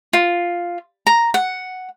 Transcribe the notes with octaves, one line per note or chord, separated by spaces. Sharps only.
F4
A#5
F#5